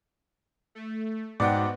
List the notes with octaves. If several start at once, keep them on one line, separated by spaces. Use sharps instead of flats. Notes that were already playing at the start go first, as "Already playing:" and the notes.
A3
G#2 B3 F#4 D5 F#5 G5